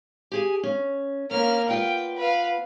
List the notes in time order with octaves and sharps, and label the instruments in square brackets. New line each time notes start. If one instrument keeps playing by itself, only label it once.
[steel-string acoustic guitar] G4 G#4 G#5
C#4
[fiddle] A#3 F6 [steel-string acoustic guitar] C#4
[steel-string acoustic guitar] B3 F4 D5 [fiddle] G5
[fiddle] B4 F5